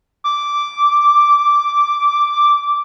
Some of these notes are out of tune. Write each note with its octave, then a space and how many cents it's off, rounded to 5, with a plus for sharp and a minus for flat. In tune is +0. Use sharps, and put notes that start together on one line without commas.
D6 -5